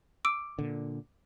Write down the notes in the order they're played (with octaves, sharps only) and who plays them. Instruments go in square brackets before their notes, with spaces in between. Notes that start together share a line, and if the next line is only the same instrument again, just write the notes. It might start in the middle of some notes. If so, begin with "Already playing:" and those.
[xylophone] D6 E6 D7
[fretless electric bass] A#2 D3